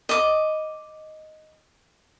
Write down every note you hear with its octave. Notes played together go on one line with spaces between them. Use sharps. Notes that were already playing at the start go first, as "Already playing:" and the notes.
D#5 D6